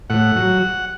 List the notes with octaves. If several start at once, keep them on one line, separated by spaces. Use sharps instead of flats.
A2 F#5
F#3